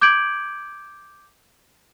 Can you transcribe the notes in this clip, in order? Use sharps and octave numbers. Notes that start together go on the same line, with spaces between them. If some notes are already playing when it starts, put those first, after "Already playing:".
D6 G6 G#6 D7 F#7